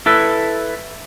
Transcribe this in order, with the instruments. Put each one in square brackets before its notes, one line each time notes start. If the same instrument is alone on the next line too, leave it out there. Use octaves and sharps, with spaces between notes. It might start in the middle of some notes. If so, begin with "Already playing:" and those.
[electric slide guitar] E4 A4 B4